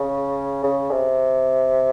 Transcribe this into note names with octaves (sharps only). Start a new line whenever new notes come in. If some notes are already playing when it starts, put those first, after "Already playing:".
Already playing: C#3
C#3
C3